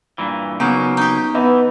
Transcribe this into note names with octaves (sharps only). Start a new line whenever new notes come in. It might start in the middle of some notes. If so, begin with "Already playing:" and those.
G2 A#2 E3
C#3 F#3 A#3 B3 D#4
D#4 G4
E3 B3 D#5